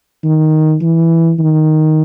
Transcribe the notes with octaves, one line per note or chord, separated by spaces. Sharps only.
D#3
E3
D#3